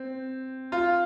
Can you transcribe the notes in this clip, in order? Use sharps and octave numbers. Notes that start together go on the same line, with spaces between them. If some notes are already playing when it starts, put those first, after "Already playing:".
Already playing: C4
F4